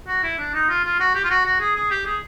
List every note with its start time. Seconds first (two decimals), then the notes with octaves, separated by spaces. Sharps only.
0.08 F#4
0.24 E4
0.39 D4
0.54 D#4
0.69 F4
0.85 F4
1.00 F#4
1.15 G4
1.24 F4
1.30 F#4
1.45 F#4
1.60 G#4
1.76 G#4
1.91 G4
2.06 G#4